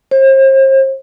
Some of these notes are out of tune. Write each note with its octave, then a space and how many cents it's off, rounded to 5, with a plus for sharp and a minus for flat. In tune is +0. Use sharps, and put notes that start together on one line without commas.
C5 +40